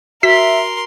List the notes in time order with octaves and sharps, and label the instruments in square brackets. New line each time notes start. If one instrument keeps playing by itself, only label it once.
[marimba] F#4 [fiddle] A#4 C6 [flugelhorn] E5 [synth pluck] B6